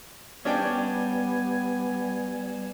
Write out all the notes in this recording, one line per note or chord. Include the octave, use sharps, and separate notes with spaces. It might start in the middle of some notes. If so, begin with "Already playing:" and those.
G3 B3 C#4 D4 G5 G#5